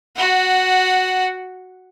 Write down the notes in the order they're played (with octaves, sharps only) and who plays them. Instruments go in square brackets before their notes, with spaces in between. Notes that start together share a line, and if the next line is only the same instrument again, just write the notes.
[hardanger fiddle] F#4 F#5